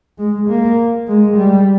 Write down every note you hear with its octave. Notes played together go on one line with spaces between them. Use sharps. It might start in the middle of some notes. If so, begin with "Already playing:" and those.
G#3
A#3
G#3
G3